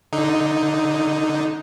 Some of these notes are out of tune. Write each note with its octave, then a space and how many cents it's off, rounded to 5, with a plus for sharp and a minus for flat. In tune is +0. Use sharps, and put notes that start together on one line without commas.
D3 +0 D#4 +0